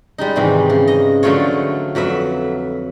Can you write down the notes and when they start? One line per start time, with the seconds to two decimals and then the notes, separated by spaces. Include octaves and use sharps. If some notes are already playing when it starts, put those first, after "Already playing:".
0.18 G3 G#3 D#4
0.36 G#2 C3 D#3 E3
0.70 C#3
0.88 D#5 A#5
1.23 D3 F3 F#3 A3 F4 C#5
1.95 F2 F#3 B4 E5